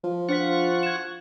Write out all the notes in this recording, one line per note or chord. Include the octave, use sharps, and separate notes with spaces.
F3
D4 F4 C5 F#5 C#6 B6
G#6 E7